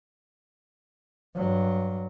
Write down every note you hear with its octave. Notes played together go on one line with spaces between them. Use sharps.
G2 F#3